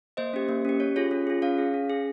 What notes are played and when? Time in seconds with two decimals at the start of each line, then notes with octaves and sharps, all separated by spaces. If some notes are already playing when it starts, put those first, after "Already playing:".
0.17 A#3 C5 D#5
0.34 C#4 G4
0.49 A#3
0.65 C#4 G4
0.80 C#4 C#5
0.96 F4 G#4 C#5
1.11 C#4
1.27 F4 G#4
1.42 C#4 C#5 F5
1.58 G#4
1.74 C#4
1.90 G#4